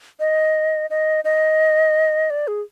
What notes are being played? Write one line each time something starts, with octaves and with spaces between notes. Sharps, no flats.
D#5
D#5
D#5
D5
G#4